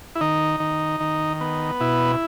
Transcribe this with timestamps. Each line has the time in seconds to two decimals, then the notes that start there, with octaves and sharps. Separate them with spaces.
0.15 E4
0.21 D#3 D#4
0.60 D#3
1.00 D#3
1.41 B3
1.80 B2 E4